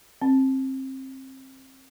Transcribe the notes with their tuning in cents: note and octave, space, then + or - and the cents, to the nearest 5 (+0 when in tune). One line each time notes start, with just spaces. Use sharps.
C4 +25